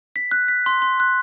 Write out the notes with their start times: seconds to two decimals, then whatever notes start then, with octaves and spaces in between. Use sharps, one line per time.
0.16 B6
0.31 F#6
0.48 B6
0.66 C6
0.82 C6
1.00 F#6